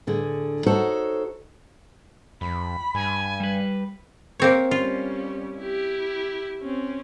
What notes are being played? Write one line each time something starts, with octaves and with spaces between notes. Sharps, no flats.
A2 D3 G#4
D#4 F#4 A4 C5 C#5
F2 B5
G2 G#5
G3 B4
A#3 C4 C#5
G3 C#4 F4
E4 G4
C4 C#4